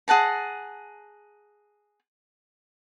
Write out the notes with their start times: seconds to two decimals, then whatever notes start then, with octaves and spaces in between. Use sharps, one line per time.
0.08 G#4 F#5 A5 A#5